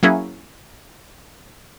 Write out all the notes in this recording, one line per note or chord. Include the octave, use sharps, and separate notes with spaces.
F#3 A#3 C#4 E4 G#4